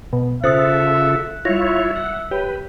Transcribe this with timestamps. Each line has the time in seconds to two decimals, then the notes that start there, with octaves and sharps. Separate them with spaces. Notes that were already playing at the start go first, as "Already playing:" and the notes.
0.13 B2
0.44 C#3 F4 A4 C5 E5 D#6 F#6 A6
1.45 G3 E4 F4 C#5 E5 A#6
1.96 F#5
2.31 G4 B4 C#5